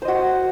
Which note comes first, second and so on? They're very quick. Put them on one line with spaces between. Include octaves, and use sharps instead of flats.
C5 D#5 F#4